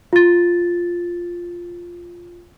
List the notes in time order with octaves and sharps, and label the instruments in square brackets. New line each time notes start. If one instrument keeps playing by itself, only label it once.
[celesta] F4 A6